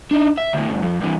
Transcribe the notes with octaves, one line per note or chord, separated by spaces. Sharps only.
D4 D#4
E5
D2 A2
D2 G2
F2
G2 E3